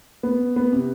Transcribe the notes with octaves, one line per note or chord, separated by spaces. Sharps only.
B3
B3
C3